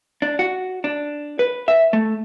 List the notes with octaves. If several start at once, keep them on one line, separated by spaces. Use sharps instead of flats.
D4
F#4
D4
B4
E5
A3